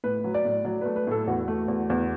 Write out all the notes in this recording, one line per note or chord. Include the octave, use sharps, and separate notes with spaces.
A2 B4
F#3
D5
A2
F#3 D5
A3 B4
B4
A2 A4
E2 F#4
A3
E2
E2